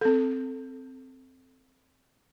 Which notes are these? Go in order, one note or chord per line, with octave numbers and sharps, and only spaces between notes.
C4 A4